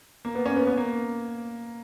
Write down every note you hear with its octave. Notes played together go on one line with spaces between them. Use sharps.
A#3
B3
C#4
B3
B3
A#3